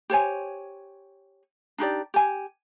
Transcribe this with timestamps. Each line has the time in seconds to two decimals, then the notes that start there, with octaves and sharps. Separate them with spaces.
0.10 G4 C5 C#5 G#5
1.78 D4 D#4 G4 D5
2.14 G4 G#5